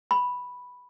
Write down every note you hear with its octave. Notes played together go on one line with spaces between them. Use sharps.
B5